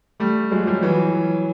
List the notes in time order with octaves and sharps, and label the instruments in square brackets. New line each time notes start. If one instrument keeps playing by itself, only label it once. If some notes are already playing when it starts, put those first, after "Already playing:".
[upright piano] G3 A3
F#3 G#3
F3 G3
E3 F#3